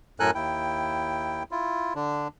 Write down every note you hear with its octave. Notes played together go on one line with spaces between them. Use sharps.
F#2 A2 A4 A#4 G#5 F#6
D#2 E4 G5
E4 F4
D3 D4